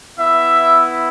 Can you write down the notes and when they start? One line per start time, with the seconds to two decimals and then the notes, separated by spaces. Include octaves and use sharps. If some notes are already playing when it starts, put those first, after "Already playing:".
0.17 B3 E4 E5